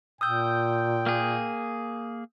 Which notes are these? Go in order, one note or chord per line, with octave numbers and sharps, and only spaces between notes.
A#2 G5 D#6 E6 G6
A#3 G#4